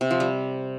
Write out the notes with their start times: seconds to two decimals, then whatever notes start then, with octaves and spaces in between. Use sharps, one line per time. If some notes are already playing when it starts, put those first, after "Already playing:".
0.01 C3
0.11 F3
0.20 G3